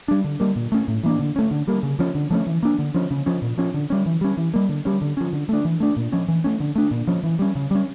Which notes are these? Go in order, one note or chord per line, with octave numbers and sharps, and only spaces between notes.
G3 D4
D3
G3 A#3
A#2
A3 C#4
A2
E3 A#3 D4
D3
A3 C#4
D3
G3 A#3
C#3
F3 C#4
D3
F3 A3 C#4
E3
A#3 D4
D3
F3 C#4
C#3
F3 C#4
A#2
F3 C#4
D3
G3 C#4
E3
G3 C#4
E3
G3 A#3
D3
G3 C#4
D3
F3 C#4
D3
A3 D4
E3
A3 D4
A#2
F3 C#4
E3
A3 C#4
D3
A3 D4
A#2
F3 C#4
E3
G3 C#4
C#3
G3 C#4